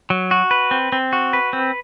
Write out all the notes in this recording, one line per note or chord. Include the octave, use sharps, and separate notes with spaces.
F#3
F#4
B4
C4
C4
F#4
B4
C4